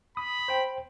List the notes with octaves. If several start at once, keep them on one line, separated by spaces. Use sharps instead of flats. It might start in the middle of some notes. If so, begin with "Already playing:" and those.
B5 D#6
C5 G5